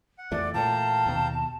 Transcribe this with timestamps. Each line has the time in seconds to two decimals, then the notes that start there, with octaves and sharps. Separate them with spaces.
0.18 F#5
0.32 F2 E3 A3 D5
0.54 A#2 E3 A3 F5 G5 A5 A#5
1.06 D#2 B2